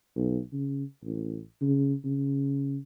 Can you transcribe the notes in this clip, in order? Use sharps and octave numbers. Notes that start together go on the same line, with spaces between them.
B1
C#3
A1
C#3
C#3